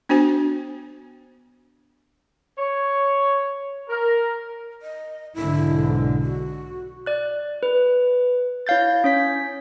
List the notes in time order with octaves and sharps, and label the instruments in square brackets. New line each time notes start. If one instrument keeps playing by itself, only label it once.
[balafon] B3 D4 F#4 C5 G#5
[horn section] C#5
A#4
[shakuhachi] D#5
[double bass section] B1 G#2 D3 [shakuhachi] E4
[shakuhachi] F#4
[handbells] D5 F#6
B4
E4 C#5 F5 G6 A6
C#4 C#5 B6